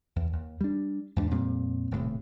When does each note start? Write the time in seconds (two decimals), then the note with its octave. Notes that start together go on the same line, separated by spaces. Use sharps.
0.16 E2
0.33 D#2
0.61 G3 D4
1.16 E2 G#2 A#3 D4
1.31 F2 A#2 G3 C4
1.91 D#1 A2 C3